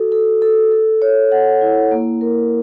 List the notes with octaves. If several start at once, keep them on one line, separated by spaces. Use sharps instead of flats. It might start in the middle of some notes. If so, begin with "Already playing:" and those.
Already playing: F#4 A4
A4
A4
A4
C#5
F#5
E4
A#3
A#4